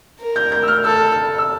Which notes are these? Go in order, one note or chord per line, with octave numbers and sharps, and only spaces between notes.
A#4
G6
G6
E6
F6
A4 E6
E6